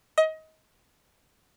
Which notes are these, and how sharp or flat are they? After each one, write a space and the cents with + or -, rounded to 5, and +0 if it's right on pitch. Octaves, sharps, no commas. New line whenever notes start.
D#5 +25